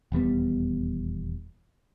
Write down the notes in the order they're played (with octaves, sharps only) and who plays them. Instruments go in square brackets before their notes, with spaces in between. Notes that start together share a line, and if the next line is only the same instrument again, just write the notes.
[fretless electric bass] D#1 E2 G3 B3